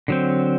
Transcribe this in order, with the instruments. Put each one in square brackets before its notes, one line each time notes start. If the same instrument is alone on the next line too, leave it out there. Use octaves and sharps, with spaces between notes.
[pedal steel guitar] D3 F#3 C4